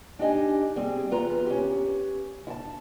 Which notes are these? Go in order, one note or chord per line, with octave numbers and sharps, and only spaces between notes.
D4 D#4 G4 D#5 G#5
G3 C4 G#4
E2 F4 B4 A#5
C#4 G4
E4 A5